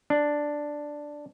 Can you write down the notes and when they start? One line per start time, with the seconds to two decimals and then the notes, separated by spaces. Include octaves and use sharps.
0.10 D4